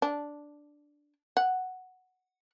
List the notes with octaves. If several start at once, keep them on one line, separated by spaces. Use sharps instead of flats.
D4
F#5